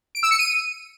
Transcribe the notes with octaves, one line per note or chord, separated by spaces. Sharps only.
D7
E6
C#7
D#7